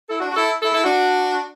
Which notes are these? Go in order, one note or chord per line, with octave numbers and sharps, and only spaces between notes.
E4 A4
D4 F#4
F#4
E4 A4
E4 A4
E4 A4
D4 F#4